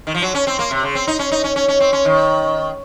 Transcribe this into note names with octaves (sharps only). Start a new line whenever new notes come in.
D#3
F3
F#3
C#4
C4
A#3
C3
C#3
C4
D#4
C#4
D#4
C#4
C#4
C#4
C4
C#4
D#3